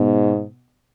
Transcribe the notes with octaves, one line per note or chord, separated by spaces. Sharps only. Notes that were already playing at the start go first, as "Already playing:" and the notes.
Already playing: G#2 B2